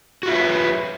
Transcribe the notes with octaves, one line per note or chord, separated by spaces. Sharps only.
F4 F#4 B4 C#5 E5